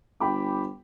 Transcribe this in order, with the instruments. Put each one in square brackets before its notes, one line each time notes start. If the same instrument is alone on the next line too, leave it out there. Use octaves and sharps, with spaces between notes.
[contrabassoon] G1 [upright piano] G5 B5 D6